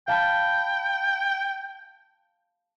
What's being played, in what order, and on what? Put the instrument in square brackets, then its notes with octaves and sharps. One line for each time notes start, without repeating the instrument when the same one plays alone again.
[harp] F5 A5 B5 [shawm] G5